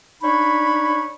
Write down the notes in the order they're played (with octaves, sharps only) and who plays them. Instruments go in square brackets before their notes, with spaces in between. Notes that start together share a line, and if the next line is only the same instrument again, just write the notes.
[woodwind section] D4 D#4 C#5 B5